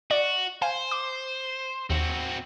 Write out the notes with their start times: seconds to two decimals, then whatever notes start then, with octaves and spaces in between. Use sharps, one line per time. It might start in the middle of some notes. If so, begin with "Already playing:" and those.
0.11 F#4 D5
0.62 C5 F5 G#5
0.91 D6
1.90 D#2 C4 F#4